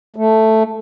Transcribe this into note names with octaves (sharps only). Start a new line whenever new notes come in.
A3